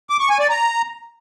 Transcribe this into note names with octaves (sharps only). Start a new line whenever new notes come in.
D6
C#6
G#5
D5
A#5